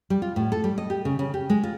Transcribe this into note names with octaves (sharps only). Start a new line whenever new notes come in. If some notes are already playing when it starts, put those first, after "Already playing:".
G3
F4
A2
A4
G3
D#5
G4
C#3
C#3
G4
G#3
F4